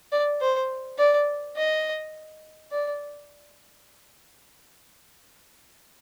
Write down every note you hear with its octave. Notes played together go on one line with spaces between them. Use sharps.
D5
C5
D5
D#5
D5